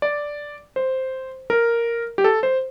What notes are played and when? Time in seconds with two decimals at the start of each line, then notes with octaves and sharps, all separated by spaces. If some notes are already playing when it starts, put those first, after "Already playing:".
0.02 D5
0.76 C5
1.50 A#4
2.18 G4
2.24 A4
2.43 C5